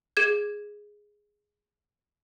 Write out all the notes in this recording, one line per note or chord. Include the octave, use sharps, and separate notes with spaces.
G#4 G#6